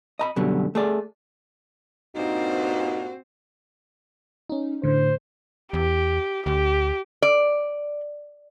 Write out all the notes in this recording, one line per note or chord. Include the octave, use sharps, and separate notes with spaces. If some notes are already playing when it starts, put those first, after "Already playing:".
D#5 A#5 B5
F#2 B2 D3 G3
A3 G#4 D5
G2 A#2 C4 D#4 F#4 C5
C#4 D#4
A2 D3 C5
E2 G4
D2 G4
D5